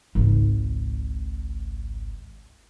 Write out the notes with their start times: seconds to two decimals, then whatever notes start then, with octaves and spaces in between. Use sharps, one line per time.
0.15 G#1 C#2